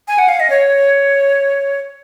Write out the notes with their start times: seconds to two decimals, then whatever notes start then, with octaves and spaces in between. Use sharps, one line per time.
0.08 G#5
0.18 F#5
0.28 F5
0.40 D#5
0.50 C#5